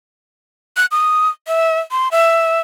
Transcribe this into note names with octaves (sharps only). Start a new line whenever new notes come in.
F#6
D#6
E5
C6
E5